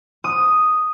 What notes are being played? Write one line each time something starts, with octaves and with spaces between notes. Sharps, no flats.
D#6